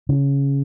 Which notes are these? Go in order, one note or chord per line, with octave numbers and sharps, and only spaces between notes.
C#3